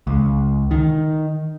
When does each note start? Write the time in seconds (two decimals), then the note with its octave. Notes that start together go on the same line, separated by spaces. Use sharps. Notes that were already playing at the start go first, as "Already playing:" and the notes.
0.07 C#2
0.71 D#3